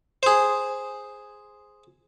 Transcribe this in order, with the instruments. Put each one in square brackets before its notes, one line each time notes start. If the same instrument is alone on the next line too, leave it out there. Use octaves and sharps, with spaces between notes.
[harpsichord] G#4 C5